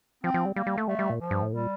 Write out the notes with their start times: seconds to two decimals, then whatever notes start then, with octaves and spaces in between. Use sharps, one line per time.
0.24 F3 C4
0.34 F3
0.45 G3
0.56 G3 A#3
0.66 G3
0.78 A3
0.88 G3 A3
0.99 G3
1.10 A#2
1.20 F3
1.31 G2
1.42 A2
1.53 A#2 G3